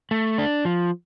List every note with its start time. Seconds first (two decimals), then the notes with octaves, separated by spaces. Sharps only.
0.11 A3
0.38 D4
0.65 F3